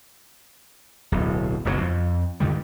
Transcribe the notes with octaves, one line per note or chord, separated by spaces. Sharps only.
D1 B1
F#1 B1 A2 F#3
F2
G2 D3 D#3 G3